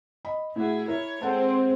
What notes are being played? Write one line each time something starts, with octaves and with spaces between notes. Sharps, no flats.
D#5 B5
A2 E4 F#4 G#4
E4 A#4 C#5
G#3 C4 A4 F#5 A5